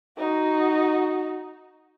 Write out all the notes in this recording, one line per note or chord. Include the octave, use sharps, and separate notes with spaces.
D#4 F#4